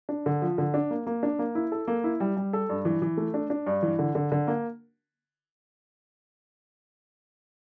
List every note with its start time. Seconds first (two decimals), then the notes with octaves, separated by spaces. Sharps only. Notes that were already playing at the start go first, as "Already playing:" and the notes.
0.09 D4
0.26 D3
0.42 F3
0.58 D3
0.74 D4
0.91 A#3
1.06 A#3
1.23 D4
1.39 A#3
1.55 E4
1.72 A4
1.87 A#3
2.04 E4
2.20 G3
2.37 G3
2.53 A4
2.69 G2
2.85 E3
3.02 E3
3.17 A3
3.34 D4
3.50 D4
3.66 G2
3.83 E3
3.99 D3
4.15 D3
4.32 D3
4.47 A#3